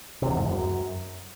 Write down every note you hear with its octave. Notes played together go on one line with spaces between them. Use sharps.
C3
E2
G#2
E2
F#2